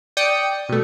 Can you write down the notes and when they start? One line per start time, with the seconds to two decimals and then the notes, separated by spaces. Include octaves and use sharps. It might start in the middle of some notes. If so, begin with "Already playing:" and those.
0.17 D5 G5 D#6 C#7
0.69 B2 A3